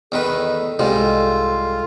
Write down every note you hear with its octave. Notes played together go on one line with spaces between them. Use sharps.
E2 D#3 A4 B4
C2 G#2 G3 F4